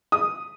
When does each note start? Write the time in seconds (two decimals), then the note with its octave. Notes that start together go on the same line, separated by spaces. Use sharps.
0.12 D#6